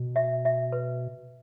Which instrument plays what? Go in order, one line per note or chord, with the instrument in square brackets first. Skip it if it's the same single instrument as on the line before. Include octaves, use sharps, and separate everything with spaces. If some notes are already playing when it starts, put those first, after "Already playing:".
Already playing: [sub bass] B2
[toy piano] E5
E5
B4